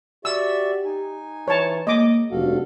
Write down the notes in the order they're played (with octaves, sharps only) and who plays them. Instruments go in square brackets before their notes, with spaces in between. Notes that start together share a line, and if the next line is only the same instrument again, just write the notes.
[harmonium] F#4 D5 E5 [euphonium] G4 [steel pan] E6
[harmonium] D#4 G#5
[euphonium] E3 [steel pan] C#5 A5
[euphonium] G#3 [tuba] A#3 [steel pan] D#5 D6
[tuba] F1 [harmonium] G2 A4 F5 [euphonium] F#4